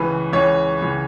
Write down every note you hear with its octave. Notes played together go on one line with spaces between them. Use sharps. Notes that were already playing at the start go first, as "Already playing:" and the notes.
Already playing: C#2 C#3 E3 B4
C#2 C#3 E3 C#5
C#2 C#3 E3